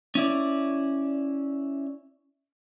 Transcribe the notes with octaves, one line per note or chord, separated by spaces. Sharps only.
C#4 E4 D5